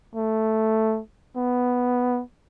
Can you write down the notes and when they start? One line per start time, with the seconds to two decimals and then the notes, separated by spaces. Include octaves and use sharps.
0.15 A3
1.37 B3